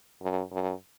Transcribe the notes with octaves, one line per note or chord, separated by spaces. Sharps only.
F#2
F#2